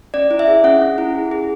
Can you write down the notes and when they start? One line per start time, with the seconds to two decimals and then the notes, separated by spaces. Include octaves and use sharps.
0.14 C#4 D5
0.31 E4
0.39 E5
0.48 G#4
0.64 C#4 F#5
0.81 C#4
0.98 E4
1.15 G#4
1.31 G#4